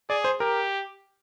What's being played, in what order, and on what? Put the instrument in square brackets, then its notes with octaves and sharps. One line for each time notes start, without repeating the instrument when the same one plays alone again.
[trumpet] G#4 [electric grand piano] D5
[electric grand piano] C5
[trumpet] G4 [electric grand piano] A#4